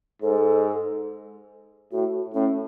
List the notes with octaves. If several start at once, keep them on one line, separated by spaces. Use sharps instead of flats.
G#2 A4
A2 F#4
A2 C#4